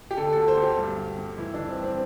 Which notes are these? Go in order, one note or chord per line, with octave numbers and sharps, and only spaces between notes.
G4
D3 A4
D2 A4
C5
D2
G4
G2
G2
G2
E3 E4
E3 D4
C4
G2
C4